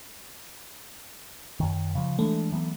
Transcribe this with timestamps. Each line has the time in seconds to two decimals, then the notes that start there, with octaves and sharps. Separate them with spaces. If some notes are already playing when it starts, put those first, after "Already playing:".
1.60 F#2 D#3
1.95 C#3 F3
2.19 E3 G#3 A3 D4
2.52 E3 F#3 B3